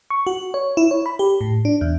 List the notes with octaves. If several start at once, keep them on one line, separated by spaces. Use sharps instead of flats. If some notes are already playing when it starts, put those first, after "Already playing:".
C#6
F#4
C#5
E4
C#5
B5
G4
A2
D4
E2